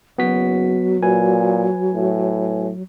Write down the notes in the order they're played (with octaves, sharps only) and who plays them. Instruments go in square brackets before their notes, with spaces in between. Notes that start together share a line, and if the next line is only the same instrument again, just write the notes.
[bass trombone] F#1 [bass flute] F#3 [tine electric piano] B3 F#4 B6
[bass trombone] A#2 [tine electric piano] B4 G#5
[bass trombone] A2